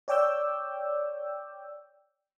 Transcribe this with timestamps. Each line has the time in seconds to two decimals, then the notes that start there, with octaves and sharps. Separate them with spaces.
0.08 C#5 D5 G5 D6 E6 G6